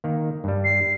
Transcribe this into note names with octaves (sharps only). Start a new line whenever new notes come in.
D#3 A#3
G2 G3
C7